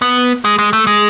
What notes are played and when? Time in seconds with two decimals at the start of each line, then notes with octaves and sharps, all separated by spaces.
0.02 B3
0.45 G#3
0.59 G#3
0.73 A3
0.87 G#3